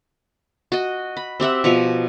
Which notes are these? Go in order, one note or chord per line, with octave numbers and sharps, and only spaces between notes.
F#4 D#5
B5
C4 G4 E5 F#5
B2 F3 A#5 C#6